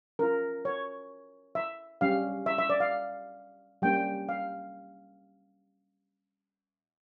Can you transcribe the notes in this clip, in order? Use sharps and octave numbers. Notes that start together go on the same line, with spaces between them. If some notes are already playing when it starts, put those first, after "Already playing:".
C#4 F4 A#4
C#5
E5
G3 C#4 G4 F5
E5
E5
D5
F5
G3 A#3 C#4 G5
F5